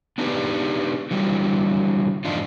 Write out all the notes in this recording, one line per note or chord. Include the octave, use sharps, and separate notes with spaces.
B3 D4 D#4 G4 B4
D3 E3 F#3 G3
F2 G#2 E3 D4 D#4 F4